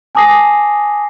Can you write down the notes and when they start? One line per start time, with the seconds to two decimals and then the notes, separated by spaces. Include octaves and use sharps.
0.15 G#5 A5 D6 D#6 A#6 C7